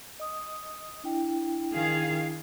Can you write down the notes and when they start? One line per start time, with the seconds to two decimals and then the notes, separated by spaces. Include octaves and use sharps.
0.20 D#5 D#6
1.04 D4 E4 G5
1.73 D#3 G#4 F5